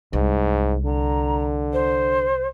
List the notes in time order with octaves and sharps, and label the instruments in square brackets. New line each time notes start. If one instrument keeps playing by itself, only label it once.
[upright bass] C2 [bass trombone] G#2
[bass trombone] D3 [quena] A#5
[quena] C5